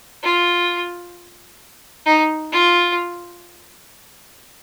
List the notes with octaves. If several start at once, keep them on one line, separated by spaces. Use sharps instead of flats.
F4
D#4
F4